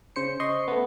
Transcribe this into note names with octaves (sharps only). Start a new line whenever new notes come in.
C#3 C5 C#7
D#5 C6 C#6
A3 B3